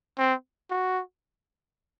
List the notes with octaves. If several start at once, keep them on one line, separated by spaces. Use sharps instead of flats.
C4
F#4